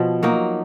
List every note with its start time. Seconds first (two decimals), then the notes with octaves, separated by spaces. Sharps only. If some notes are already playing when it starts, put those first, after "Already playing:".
Already playing: B2 F3
0.23 F#3 A#3 D#4